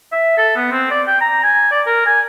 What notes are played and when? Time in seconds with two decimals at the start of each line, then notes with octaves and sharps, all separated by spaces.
0.12 E5
0.37 A4
0.56 B3
0.72 C4
0.91 D5
1.07 G5
1.21 A#5
1.43 G#5
1.72 D5
1.86 A#4
2.06 G#5